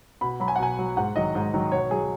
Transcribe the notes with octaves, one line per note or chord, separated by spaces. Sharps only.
B2 B5
F#3 B5
G#5
F#5
B2 G#5
F#3
G#2 F#5
D#3 F#3 D#5
G#2
D#3 F#3
B2 C#5
F#3 G#4